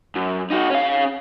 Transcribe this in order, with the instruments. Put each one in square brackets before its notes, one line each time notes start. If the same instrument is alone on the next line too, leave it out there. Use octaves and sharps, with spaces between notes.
[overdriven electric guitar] F#2
D#4 F#4
C#4 F5